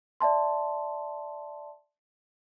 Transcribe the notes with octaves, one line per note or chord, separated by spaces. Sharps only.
D5 E5 A5 C6